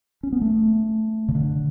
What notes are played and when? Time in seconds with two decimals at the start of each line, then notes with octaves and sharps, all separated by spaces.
0.23 C#4
0.32 B3
0.41 A3
1.29 C#3
1.35 D3